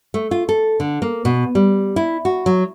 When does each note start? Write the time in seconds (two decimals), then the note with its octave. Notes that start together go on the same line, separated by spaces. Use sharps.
0.14 A3
0.31 F4
0.49 A4
0.80 D3
1.02 A#3
1.25 B2
1.55 G3
1.96 E4
2.25 F#4
2.46 F#3